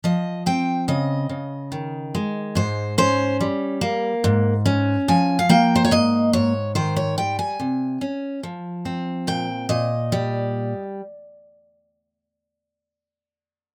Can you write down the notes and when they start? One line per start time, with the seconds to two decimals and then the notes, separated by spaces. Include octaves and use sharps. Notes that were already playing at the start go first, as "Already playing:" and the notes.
0.04 F3 D#5
0.46 C4 G5
0.88 C#3 D#5
1.29 C#3
1.72 D#3
2.15 G#3
2.55 G#2 C5
2.98 C#4 C5
3.41 G3
3.81 A#3
4.24 G#2
4.66 C#4
5.08 F3 G#5
5.39 F5
5.49 A#3 G5
5.76 C5
5.85 C#5
5.91 G#2 D#5
6.33 G#2 C#5
6.75 D#3 C5
6.96 C#5
7.18 G3 G5
7.39 G#5
7.60 C3
8.01 C#4
8.43 F3
8.85 C4
9.27 A#2 G5
9.69 A#2 D#5
10.12 G3